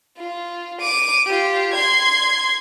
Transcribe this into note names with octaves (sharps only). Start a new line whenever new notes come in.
F4
D6 D#7
F4 G4
C6 G#6